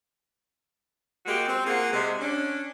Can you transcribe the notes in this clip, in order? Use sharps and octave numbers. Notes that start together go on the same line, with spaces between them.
G#3 A#3 F#4 G4
C4
A#3 F4 G#4 F#5
C3 G#3
C#4 D4